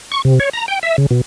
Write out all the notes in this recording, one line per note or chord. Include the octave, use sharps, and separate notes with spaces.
C#6
C3
C#5
A#5
G5
E5
C#3
B2